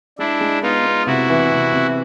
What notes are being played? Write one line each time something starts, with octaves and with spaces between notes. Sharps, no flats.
G#3 D4 E4
G#3
B3 D#4 F4
B3
C3 E4 F#4
E3
C3
C3